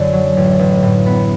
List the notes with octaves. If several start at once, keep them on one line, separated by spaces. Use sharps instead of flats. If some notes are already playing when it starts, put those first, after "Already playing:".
Already playing: F#2 D3 A3
F#3
A1
A1
A2
B3